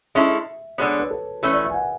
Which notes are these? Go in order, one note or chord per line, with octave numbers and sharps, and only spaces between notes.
G#3 C#4 E4 A4 E5
D3 G#3 B3 C#5
B4
A4
E3 A3 C#4 B4
D5
E5
G#5
F#5